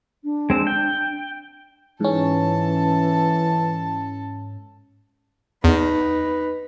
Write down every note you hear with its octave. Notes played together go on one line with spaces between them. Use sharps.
D4
G#3 C4
G5
G#2 E3 C#4 A4 A5
E2 D#4 B4